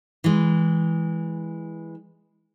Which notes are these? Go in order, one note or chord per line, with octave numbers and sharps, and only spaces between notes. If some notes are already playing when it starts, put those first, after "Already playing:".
E3 G#3